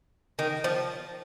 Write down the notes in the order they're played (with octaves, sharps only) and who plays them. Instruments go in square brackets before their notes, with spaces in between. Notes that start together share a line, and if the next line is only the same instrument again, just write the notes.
[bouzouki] D#3
F3